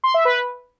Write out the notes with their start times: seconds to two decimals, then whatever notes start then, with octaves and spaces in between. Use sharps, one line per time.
0.04 C6
0.14 E5
0.25 B4